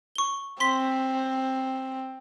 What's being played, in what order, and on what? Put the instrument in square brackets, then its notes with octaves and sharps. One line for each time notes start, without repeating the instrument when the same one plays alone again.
[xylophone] C#6 G7
[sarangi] C4 [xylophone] C6 B6